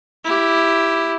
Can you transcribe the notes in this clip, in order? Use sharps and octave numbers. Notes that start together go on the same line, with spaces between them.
E4 G4